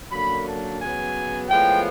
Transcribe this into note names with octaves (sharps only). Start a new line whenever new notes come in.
F#2 D3 F#3 A#3 B5
A5
C#3 F#3 B3 G#5
A2 F3 G#3 B3 G5